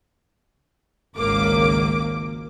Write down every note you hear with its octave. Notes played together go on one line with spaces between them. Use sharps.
G#1 C#2 A#3 D6